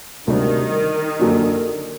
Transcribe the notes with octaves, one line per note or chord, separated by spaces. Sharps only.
D2 C3 D#3 G3 D4
F#2 D3 F#3 A#3 D4